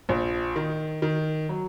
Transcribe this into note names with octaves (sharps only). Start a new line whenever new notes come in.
A#1
D#3
D#3
F#3